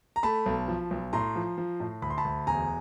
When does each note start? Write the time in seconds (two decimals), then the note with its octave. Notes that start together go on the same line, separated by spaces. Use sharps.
0.16 A#5
0.23 A3 A5 B5
0.46 B1
0.68 F3
0.91 B1
1.13 A2 A#5 C6
1.36 F3
1.58 F3
1.80 A2
2.02 D2 B5
2.10 C6
2.18 A5 B5
2.25 D2
2.47 E1 G#5 A#5